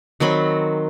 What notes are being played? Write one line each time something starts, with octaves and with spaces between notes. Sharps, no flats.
D#3 F#3 C4 B5